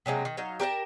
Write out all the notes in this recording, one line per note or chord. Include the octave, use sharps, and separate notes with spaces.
C3 F#3 G#3 A#3
D#3
F#3 D#4 F5
G4 A#4 F5 A5